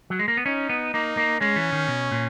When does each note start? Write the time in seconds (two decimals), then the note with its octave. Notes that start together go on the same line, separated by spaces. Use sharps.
0.10 F#3
0.19 G#3
0.28 A#3
0.37 B3
0.46 C#4 D#4
0.69 B3
0.93 A#3 D#4
1.17 A#3
1.40 G#3 C#4
1.56 E3
1.73 D#3
1.88 B2
2.12 A#2